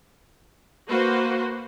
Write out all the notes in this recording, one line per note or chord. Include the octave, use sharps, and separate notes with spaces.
A#3 F#4 B4 C5